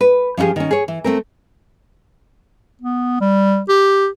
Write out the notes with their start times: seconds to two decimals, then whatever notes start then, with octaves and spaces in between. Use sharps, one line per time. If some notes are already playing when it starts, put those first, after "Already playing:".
0.01 B4
0.37 F3 C#4 E4 G4 G#4
0.56 D#3 C#4
0.71 G#4 C#5
0.88 E3
1.04 A3 C4 A#4
2.82 B3
3.21 G3
3.69 G4